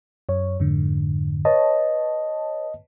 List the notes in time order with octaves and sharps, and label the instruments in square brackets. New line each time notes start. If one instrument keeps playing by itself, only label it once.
[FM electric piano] F#2 C#5
F2 G#2 D3
[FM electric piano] B4 C#5 A5 [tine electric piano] D#5